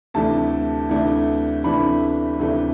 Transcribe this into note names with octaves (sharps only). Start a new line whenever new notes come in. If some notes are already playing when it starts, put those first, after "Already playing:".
D2 C3 E3 A3 D4 A5
D2 C3 E3 A3 D4
D2 C3 E3 A3 D4 B5
D2 C3 E3 A3 D4